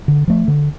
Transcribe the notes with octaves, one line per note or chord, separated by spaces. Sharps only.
D3
F3 A3
D3